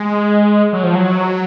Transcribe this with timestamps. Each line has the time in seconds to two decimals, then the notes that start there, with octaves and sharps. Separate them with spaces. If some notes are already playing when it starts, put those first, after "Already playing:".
Already playing: G#3
0.73 F#3
0.84 F3
0.95 F#3